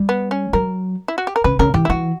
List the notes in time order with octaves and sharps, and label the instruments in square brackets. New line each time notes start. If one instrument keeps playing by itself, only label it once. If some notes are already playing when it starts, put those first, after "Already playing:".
Already playing: [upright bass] G3
[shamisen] B3
C#4
[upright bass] F#3 [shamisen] A#4
[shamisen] E4
F#4
G4
A#4
[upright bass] C#3 [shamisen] B4
[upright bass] C#3 [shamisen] A#4
[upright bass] E3 [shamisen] G4
[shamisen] E4
[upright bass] E3 [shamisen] F#4